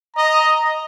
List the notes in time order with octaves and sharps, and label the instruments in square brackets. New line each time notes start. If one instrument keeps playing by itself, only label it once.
[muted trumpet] D#5 [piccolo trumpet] A#5